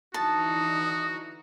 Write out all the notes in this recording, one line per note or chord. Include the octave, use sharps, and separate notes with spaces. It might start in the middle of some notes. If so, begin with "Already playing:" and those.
D3 E3 D#4 F#4 A5 D#6